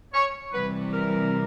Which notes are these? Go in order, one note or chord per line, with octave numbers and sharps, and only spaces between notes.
C#5
C3 E3 G3 B4
A#4